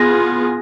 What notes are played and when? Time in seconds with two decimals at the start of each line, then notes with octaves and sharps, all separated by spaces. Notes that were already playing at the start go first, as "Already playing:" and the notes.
Already playing: B3 F4 G#4 A#6